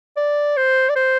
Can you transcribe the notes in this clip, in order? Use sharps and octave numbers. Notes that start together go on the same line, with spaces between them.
D5
C5
D5
C5